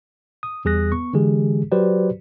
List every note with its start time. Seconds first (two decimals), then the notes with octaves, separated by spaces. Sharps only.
0.43 D#6
0.65 E2 G3 G#4 D#6 F#6 A#6
0.92 B3 C#6
1.13 D3 E3 G#3 G4 G#4
1.72 F#3 F#4 G4 B4 C5 D5